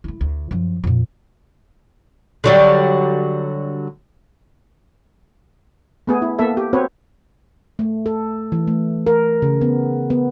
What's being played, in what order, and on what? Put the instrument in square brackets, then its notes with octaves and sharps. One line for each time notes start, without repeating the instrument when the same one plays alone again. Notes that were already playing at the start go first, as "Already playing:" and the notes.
[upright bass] A3 E4
D2
F#2 F3
F2 A#2
[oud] D3 F#3 G3
[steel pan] A3 B3 G#4
E4
A#3 B3 A4 E5
G4
C4 F#4 B4 C#5
[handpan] A3
A4
E3
A3
A#4
C#3
B3
B3